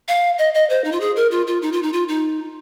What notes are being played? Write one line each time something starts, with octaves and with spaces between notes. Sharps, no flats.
F5
D#5
D#5
C5
D#4
F4
G#4
A#4
F4
F4
D#4
F4
D#4
F4
D#4